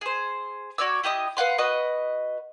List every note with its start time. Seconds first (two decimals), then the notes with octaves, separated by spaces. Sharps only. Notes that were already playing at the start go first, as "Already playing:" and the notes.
0.01 G#4 C5
0.78 F#4 C#5 D5 E6
1.03 E4 G4 D#5 D#6
1.37 B4 F5 F#5 C6
1.58 F#4 B4 D#5